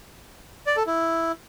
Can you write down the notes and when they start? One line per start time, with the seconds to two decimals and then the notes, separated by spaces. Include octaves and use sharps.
0.67 D5
0.77 A4
0.87 E4